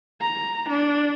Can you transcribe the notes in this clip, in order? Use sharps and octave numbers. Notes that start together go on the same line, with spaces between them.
A#5
D4